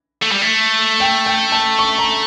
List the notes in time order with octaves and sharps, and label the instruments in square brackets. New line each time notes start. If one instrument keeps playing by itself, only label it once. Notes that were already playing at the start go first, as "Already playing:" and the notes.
[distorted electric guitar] A3
G3
A3
[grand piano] G5
G5
A5
C#6
A#5